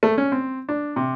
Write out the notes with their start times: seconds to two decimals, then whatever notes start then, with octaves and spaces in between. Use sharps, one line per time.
0.03 A3
0.18 C#4
0.32 C4
0.69 D4
0.96 C3